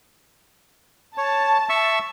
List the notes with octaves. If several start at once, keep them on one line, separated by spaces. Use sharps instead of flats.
C#5 A5
E5 C#6 E6